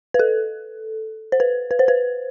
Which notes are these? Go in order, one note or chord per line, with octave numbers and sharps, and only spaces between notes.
B4
A4
C5
B4
B4
C5
B4